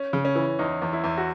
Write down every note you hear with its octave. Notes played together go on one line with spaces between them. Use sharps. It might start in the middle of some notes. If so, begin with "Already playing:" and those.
Already playing: C#4
C#3
C#4
E3
E2 D#4
E2
E4
E2
F#4